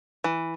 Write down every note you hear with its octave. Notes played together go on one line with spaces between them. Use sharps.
E3